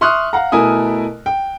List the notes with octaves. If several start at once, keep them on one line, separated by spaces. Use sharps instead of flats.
E5 C6 C#6 D#6 F6 F#6
F5 F#5 A#5
B2 A3 E4 A#4 G#5 D#6
G5